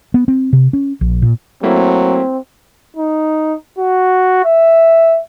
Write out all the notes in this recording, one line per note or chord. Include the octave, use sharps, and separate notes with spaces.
B3
C4
C3
C#4
A#1
A#2
F#3 A3 A#3 C4 E4
D#4
F#4
E5